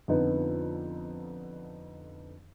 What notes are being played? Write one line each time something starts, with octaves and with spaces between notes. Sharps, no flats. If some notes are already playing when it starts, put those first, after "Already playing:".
F2 D3 F3 B3 D#4